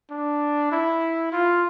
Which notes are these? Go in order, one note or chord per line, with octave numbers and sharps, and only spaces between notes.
D4
E4
F4